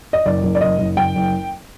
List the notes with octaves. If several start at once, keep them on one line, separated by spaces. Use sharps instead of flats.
D#5
F#1 D5
F#1
D5
F#1 D#5
F#1
F#1 G5
F#1